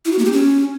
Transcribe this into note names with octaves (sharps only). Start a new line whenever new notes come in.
E4
F#4
A#3
G4
C#4